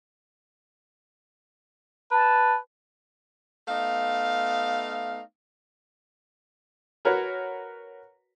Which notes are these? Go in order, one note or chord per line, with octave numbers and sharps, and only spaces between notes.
B4 A5
A3 B3 D#4 F5
F#4 A#4 B4 C#5